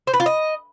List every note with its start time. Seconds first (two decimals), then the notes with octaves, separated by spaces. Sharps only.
0.07 C5
0.14 B4
0.20 F4
0.26 D#5